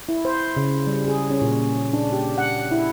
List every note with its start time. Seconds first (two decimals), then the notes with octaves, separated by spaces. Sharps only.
0.09 E4
0.25 C5
0.57 C#3
0.87 G3
1.08 G#4
1.30 C#4
1.42 A#2
1.93 D4
2.12 G4
2.38 F#5
2.71 E4